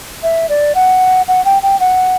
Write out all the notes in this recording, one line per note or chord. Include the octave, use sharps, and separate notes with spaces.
E5
D5
F#5
F#5
G5
G5
F#5